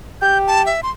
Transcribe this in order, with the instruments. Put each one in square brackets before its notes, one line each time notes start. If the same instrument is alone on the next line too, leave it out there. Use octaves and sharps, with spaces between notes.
[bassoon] G4 [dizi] G6
[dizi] A5
E5
C6